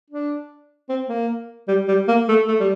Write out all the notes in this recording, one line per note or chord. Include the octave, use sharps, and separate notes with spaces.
D4
C4
A#3
G3
G3
A#3
A3
A3
G3